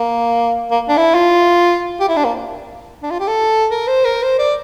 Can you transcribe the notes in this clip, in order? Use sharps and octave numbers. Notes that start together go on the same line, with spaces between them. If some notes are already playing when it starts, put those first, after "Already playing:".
Already playing: A#3
A#3
D4
E4
F4
G4
E4
D4
A#3
D4
F4
G4
A4
A#4
C5
A#4
C5
D5